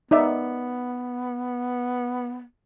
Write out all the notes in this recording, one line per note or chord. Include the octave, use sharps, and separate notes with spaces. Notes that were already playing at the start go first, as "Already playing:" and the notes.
B3 D#4 D5 E5